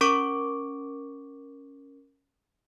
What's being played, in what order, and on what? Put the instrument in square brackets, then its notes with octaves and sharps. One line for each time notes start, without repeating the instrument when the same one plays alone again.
[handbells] C#4 A#4 C#6 D6 D7